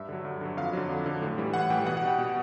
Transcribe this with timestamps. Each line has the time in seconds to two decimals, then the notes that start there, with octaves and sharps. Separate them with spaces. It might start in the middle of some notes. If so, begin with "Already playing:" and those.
Already playing: G2 E5
0.09 D3 F#3
0.25 G2
0.41 D3 F#3
0.57 F2 F5
0.73 D3 F#3
0.89 F2
1.06 D3 F#3
1.21 A2
1.38 E3 G3
1.54 A2 F#5
1.70 E3 G3 G5
1.86 B2 F#5
1.97 F#5
2.02 G3
2.07 G5
2.18 B2